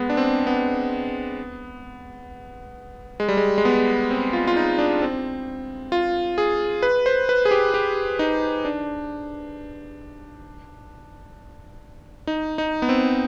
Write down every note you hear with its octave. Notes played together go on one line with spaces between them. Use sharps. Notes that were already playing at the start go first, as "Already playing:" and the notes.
Already playing: G#3 B3
D4
C4
B3
G#3
G3
G#3
G#3
B3
C4
F4
F4
D#4
D4
C4
F4
G#4
B4
C5
B4
G#4
G4
G4
D#4
D4
D#4
D#4
B3
C4